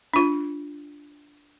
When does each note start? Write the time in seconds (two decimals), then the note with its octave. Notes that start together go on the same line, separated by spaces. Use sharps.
0.14 D4 F4